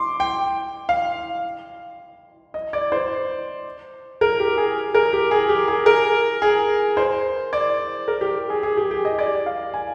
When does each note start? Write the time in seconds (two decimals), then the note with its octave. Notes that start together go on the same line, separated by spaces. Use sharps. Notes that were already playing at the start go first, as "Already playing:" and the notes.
Already playing: C6 D6
0.20 G5
0.89 F5
2.54 D#5
2.73 D5
2.92 C5
4.21 A#4
4.40 G4
4.58 G#4
4.94 A#4
5.13 G4
5.31 G#4
5.49 G4
5.68 G#4
5.86 A#4
6.42 G#4
6.97 C5
7.53 D5
8.08 A#4
8.21 G4
8.50 G#4
8.63 G#4
8.77 G4
8.91 G4
9.05 D#5
9.19 D5
9.46 F5
9.74 G#5